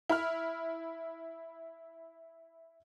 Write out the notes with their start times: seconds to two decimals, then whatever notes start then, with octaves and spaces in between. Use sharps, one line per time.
0.09 E4 B5 F6